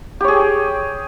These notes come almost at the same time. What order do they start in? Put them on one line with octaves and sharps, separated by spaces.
G4 C#5 G#4 G5